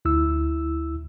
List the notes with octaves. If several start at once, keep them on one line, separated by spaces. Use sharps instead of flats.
D2 E4 E6